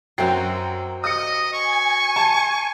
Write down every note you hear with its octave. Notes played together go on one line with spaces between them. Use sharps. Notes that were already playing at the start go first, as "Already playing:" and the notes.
F#2 F#3 C4 A#4 G5 C7
D#5 D#6 C#7
G#5 C#6
A5